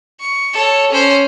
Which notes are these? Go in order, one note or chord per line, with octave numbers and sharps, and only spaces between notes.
C#6
A4 C#5
C#4 C5